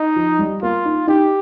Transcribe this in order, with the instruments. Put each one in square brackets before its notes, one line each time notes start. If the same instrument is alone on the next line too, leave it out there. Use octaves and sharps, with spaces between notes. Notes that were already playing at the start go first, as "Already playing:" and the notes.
Already playing: [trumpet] D#4
[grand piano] F3
G3
[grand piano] A#3 [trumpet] F4
[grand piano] D#4
[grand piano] D#4 [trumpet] G4